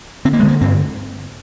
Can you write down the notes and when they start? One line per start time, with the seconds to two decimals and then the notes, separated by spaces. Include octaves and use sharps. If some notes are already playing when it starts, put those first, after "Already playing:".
0.25 D3 C4
0.33 A#3
0.40 G#3
0.43 D3
0.48 A#3
0.61 G2 C4